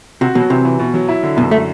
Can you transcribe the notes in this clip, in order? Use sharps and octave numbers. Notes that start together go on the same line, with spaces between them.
C3 F#4
B2 F#3
C3 E3
E3
B2
F#3
E4
D3
F#2 B2
A3